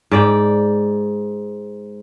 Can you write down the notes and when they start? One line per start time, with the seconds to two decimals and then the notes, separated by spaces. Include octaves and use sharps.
0.11 G#2 D5 G5